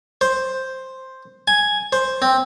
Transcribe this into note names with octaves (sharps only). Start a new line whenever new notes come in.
C5
G#5
C5
C4